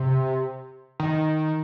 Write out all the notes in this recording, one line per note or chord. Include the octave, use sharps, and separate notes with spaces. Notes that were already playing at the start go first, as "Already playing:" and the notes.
Already playing: C3
D#3